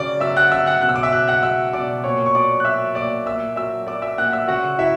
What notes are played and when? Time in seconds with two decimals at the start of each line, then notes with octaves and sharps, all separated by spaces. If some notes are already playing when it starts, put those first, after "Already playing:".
Already playing: C#3 F#3 D5 D6
0.20 F#3 E5 E6
0.37 F#5 F#6
0.52 C#3 E5 E6
0.66 F#5 F#6
0.82 B2 F#6
0.89 E6
0.96 D6
1.03 E5 E6
1.12 F#3 F#6
1.28 F#5 F#6
1.42 F#3 E5 E6
1.73 B2 D5 D6
2.04 A#2 C#5 C#6
2.26 C#6
2.35 F#3 D5 D6
2.60 F#6
2.65 F#3 E5 E6
2.95 A#2 D5 D6
3.26 A#2 E5 E6
3.56 F#3 E5 E6
3.87 F#3 D5 D6
4.02 E5 E6
4.18 A#2 F#5 F#6
4.32 E5 E6
4.48 C#3 F#4 F#5
4.78 F#3 E4 E5